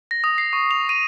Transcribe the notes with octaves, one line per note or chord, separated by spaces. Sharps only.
A#6
D#6
C7
C#6
F7
D#7